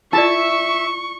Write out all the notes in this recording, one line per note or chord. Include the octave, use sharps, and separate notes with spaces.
E4 F4 D5 E5 A5 C#6